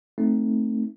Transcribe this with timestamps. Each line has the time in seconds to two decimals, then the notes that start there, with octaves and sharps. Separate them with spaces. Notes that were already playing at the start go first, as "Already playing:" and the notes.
0.18 A3 C4 D#4